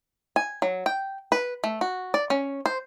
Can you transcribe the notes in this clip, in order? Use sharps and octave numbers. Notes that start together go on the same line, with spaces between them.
G#5
F#3
G5
B4
A3
F#4
D5
C#4
C5